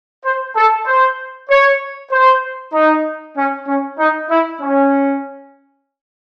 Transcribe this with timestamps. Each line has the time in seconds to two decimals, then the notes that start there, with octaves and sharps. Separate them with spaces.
0.24 C5
0.56 A4
0.86 C5
1.50 C#5
2.11 C5
2.73 D#4
3.36 C#4
3.68 C#4
3.99 D#4
4.30 E4
4.61 C#4